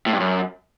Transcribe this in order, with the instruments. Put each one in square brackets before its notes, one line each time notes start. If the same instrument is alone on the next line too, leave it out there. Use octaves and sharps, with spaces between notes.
[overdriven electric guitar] A2
G2
F#2